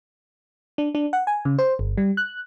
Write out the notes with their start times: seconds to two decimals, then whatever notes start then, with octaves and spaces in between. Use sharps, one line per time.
0.78 D4
0.95 D4
1.13 F#5
1.27 G#5
1.45 C#3
1.59 C5
1.79 G1
1.98 G3
2.17 F#6